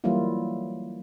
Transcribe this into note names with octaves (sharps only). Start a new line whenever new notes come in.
E3 F#3 G3 A#3 E4 F4